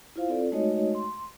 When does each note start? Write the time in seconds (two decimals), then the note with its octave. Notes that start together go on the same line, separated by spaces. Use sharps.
0.16 E4 F4 C5 F5
0.29 C4 F4 A4 D5
0.52 G#3 A3 D#4 F#4 C#5 D#5
0.95 C6